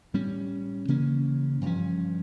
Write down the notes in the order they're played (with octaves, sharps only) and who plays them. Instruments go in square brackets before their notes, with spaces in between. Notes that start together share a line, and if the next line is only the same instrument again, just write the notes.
[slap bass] A2 G3 C#4
C#3 E3 A#3 C#4
G2 F3 C#4